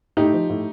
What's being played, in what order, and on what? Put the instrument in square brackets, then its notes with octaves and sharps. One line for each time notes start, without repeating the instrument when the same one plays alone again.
[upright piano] A2 D#4 G4
F3
A2